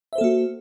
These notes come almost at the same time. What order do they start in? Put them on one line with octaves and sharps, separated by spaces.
E5 C5 A4 A#3 F#4